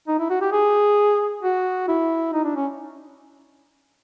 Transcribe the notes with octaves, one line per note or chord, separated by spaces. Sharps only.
D#4
E4
F#4
G4
G#4
F#4
E4
D#4
D4
C#4